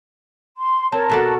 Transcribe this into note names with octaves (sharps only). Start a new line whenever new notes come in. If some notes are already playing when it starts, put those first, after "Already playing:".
C6
C4 A#4 C#5 A5
B2 F#4 A4 D5